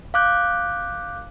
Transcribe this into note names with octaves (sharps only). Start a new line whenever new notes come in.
F5 D6 F#6 G6